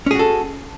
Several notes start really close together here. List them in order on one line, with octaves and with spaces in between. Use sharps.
C#4 G#4 F#4 A4